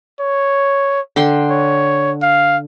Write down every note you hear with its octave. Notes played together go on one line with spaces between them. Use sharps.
C#5
D3 G5 C6
C#5
F5